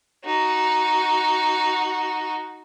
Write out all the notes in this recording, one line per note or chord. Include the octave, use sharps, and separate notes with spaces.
D#4 F#4